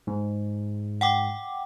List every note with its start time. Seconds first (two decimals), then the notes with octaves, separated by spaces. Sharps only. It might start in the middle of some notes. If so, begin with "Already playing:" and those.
0.07 G#2
1.01 F#5 G5 D6